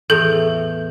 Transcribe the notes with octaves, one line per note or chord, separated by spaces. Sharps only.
E2 A2 G#4 A4 G6